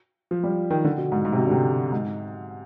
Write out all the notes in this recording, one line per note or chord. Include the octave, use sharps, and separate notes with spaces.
F3
G3
D#3
D3
B2
G#2
G#2
C3
B2
D3
C3
G#2